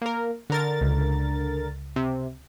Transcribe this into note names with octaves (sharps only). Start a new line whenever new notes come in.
A#3 A#4
D3 A#4 A6
C#2
C3